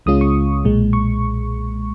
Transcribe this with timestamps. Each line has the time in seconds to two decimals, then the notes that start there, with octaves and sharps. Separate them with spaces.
0.06 C#2 C#3 G#3 C#4 F4 D#6
0.21 C#6
0.65 B1 A#2 G#3
0.93 C#6